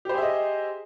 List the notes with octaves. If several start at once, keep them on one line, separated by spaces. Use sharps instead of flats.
G4 G#4 C5 D#5 E5